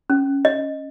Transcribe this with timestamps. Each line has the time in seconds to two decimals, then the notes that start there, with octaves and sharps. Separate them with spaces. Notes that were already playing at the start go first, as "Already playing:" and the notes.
0.10 C#4
0.45 D#5